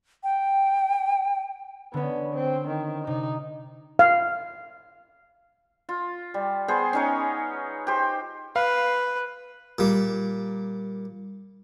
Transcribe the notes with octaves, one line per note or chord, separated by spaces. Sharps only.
G5
D3 B3 C#4
C4
D#3
C3 D#4
F5
F4
G3
B3 G#4 C5
C#4 D#4 C#5
G4 C5
B4 F5
A#2 G3